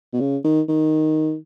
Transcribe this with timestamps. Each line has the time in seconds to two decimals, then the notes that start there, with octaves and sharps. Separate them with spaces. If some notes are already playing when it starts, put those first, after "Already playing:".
0.13 B2
0.20 C#3
0.44 D#3
0.69 D#3